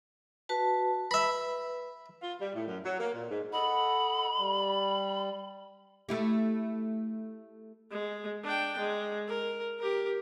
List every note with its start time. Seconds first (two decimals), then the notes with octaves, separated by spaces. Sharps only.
0.49 F#4 B4 A5
1.11 B4 E5 B5
2.22 F4
2.40 G3
2.55 A2
2.67 F#2
2.85 F#3
3.00 A#3
3.13 A#2
3.30 G#2
3.53 A4 D#5 F#5 B5
4.38 G3
6.09 A3 E4 G4
7.91 G#3
8.44 D4 G5
8.79 G#3
9.28 A#4
9.79 G4 A#4